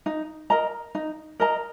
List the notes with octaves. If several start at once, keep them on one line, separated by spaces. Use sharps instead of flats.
D#4
A#4 D#5 A#5
D#4
A#4 D#5 A#5